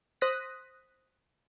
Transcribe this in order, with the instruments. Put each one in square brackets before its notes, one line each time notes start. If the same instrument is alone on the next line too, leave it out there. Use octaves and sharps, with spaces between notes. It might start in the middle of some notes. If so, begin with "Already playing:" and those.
[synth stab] C5 D#6 F#6 A#6 B6